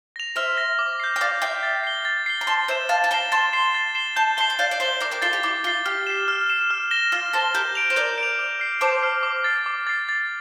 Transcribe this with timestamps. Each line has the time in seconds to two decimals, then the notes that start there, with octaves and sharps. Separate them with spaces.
0.16 A#6 F7
0.36 C5 E5 F6
0.57 A#6 F7
0.79 D6
1.00 G6 C7
1.16 G5
1.21 D5 F5 D6
1.42 E5 G5 G6 C7
1.63 A6
1.84 C7 G7
2.05 A6
2.26 C7 G7
2.41 A#5
2.47 A5 C6 A6
2.68 C5 E5 C7 E7 G7
2.89 F5 A5 A6
3.04 A5
3.11 G5 A#5 C7 E7 G7
3.32 A5 C6 A6
3.53 C7 E7 G7
3.75 A6
3.95 C7 E7 G7
4.16 A5 C6 G6
4.37 A5 C6 C7 G7
4.50 G5
4.59 D5 F5 G6
4.71 D5
4.80 C5 E5 C7 G7
5.00 A#4 D5 D6
5.11 G4 A#4
5.22 F4 A4 A6 C7 G7
5.33 G4
5.43 E4 D6
5.64 F4 A6 C7 G7
5.86 G4 F6
6.07 C7 E7
6.28 F6
6.50 C7 E7
6.71 F6
6.91 A#6 E7 G7
7.12 F4 F6
7.33 A4 C5 A#6 E7 G7
7.54 G4 A#4 G6
7.75 D7 F7
7.90 C5
7.96 A#4 D5 G6
8.18 D7 F7
8.39 D6
8.60 F6 C7
8.81 A4 C5 D6
9.03 F6 C7
9.23 D6
9.44 A6 C7
9.66 D6
9.87 A6 C7
10.09 A6